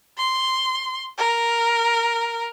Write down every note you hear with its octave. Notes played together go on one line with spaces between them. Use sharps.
C6
A#4